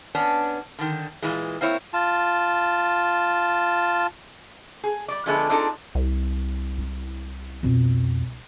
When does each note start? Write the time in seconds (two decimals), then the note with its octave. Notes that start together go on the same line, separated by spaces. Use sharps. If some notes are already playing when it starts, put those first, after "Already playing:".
0.15 B3 C#4 D4
0.79 D3 D#3
1.22 A#2 E3 G#3
1.61 A#3 C4 E4 C#5
1.93 F4 A5
4.84 G#4
5.08 G3 D5
5.26 D3 F3 G#3 A3 B3 D4
5.49 C4 D4 D#4 F4 G#4 A4
5.95 C2
6.78 E4
7.63 F2 B2